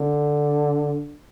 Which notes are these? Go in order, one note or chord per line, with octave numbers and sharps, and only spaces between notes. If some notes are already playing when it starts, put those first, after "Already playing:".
Already playing: D3